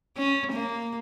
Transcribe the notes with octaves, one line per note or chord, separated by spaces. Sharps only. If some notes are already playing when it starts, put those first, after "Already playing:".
C#4
A#3